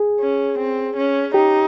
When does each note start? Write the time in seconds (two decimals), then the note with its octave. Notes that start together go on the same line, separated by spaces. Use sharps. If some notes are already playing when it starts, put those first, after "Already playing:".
Already playing: G#4
0.20 C#4
0.58 C4
0.97 C#4
1.34 D#4 G4